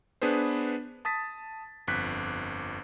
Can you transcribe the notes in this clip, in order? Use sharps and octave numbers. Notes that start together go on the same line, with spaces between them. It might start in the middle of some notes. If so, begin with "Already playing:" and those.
B3 D4 G#4 B4 C5
A5 D#6 A6 B6
G1 F2 F#6 B6